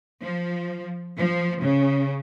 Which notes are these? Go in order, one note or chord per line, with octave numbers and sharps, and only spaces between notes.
F3
F3
C#3